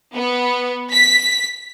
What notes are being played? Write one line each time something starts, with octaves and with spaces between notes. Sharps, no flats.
B3
B6